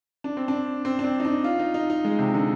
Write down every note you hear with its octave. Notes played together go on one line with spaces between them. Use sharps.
D4
C4
D4
C4
D4
C4
D#4
D4
F4
D#4
D#4
D#4
G#3
C3
D3